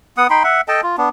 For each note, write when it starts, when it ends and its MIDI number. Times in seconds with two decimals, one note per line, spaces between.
0.17 0.27 59
0.17 0.27 78
0.17 0.27 87
0.30 0.43 63
0.30 0.43 79
0.30 0.43 83
0.30 0.43 84
0.44 0.61 76
0.44 0.61 78
0.68 0.81 69
0.68 0.81 75
0.68 0.81 79
0.68 0.81 81
0.83 0.96 65
0.98 1.09 59
0.98 1.09 62